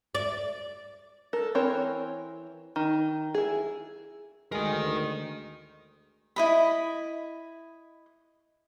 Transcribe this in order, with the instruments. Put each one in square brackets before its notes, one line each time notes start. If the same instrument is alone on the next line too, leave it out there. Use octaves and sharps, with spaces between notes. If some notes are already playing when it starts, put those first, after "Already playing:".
[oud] D5
[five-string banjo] A4 A#4
E3 C4 A#4 C#5
D#3
E4 G#4
[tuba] D2 [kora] G#3 [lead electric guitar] A#4 D#5
[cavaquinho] E4 D#5 B5